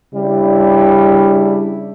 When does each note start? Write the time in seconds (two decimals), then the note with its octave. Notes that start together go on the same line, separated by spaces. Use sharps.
0.15 C#3 G3 D4 E4